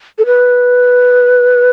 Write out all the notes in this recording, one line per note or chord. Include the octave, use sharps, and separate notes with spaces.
A4
B4